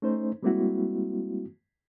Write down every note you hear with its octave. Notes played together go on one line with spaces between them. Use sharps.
A3 C#4 D#4 C5
G3 G#3 A#3 C4 E4 F#4